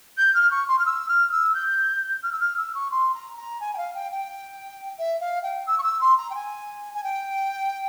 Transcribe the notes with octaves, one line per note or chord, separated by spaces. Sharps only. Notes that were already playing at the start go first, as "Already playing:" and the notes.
G6
F6
C#6
C6
F6
E6
F6
E6
G6
F6
E6
F6
E6
C#6
C6
A#5
A#5
G#5
G5
F5
G5
G5
E5
F5
G5
E6
C#6
E6
C6
A#5
G5
G#5
G#5
G5